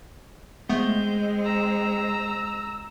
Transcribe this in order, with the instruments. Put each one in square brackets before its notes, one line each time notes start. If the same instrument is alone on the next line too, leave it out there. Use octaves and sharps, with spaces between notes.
[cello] G#3 C4 [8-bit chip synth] A3 B3 [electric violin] G6
[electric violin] A#5 E6